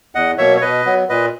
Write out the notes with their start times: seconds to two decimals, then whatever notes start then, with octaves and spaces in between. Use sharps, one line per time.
0.15 E2 D#5 F#5
0.38 B2 F#3 A#3 C#5 E5
0.57 C#5
0.61 B2 B4 D#5
0.86 F#3 B3
1.09 A#2 B4 D#5